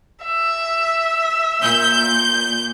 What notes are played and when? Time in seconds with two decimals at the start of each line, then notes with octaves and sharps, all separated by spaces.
0.24 E5
1.62 A#2 G6